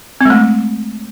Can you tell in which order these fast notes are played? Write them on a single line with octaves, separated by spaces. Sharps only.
C4 G#3 A3